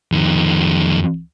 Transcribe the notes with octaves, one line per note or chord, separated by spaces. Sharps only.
F2 D#3